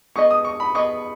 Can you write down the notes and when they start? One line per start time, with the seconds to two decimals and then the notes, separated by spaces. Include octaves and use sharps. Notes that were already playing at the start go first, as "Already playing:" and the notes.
0.16 B3 G#4 B4 D#5 C#6
0.31 D#6
0.45 C#6
0.60 B5
0.75 B3 G#4 B4 D#5 C#6